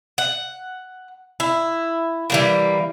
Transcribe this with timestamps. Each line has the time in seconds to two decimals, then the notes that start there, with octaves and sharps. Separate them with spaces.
0.18 F#5
1.40 E4
2.30 E3 G3 A#3